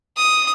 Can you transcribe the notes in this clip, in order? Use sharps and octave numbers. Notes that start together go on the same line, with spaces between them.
D#6